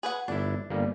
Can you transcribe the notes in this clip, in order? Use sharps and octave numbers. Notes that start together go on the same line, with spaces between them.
G#4 B4 F#5
G1 D4 E4
G1 G3 A#3